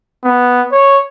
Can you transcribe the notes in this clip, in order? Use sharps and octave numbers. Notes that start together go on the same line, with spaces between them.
B3
C#5